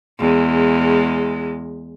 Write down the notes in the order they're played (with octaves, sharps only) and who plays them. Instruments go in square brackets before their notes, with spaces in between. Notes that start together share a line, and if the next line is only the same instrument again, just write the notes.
[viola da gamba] E2 G#3